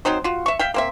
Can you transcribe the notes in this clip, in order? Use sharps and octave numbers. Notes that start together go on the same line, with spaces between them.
F#3 C4 D#4 C5
F4 F#4
E5 C#6
E5 F5 G5
A#3 C4 E5